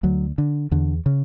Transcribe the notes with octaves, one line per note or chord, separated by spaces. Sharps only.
D2 F#3
D3
E2 D3
C#3